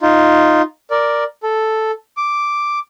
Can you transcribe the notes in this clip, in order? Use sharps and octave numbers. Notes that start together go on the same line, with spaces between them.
D#4 F4
A#4 D5
A4
D6